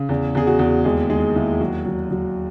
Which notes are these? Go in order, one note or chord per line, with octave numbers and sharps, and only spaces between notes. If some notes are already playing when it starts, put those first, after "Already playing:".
Already playing: C#3
E2
E2 G#4
F#4
E2
D#2 G#3 G#4
D#3 G#3 G#4
D#2 E4
F#3 F#4
F#3
F#3